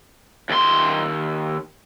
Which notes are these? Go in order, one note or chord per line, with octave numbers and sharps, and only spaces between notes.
D#2 C6